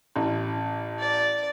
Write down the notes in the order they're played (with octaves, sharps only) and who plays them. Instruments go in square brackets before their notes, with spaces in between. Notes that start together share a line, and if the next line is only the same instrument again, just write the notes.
[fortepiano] A1
[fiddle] D5